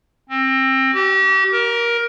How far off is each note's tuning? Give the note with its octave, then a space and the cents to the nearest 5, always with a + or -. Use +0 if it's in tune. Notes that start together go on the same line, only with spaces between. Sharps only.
C4 +25
G4 -35
A#4 +15